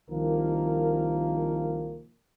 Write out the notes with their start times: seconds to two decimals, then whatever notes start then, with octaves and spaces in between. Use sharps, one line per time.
0.11 C2 D#3 F3 A#3 A#4